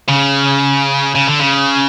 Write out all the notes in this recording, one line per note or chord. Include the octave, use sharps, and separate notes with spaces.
C#3
C#3
D3
C#3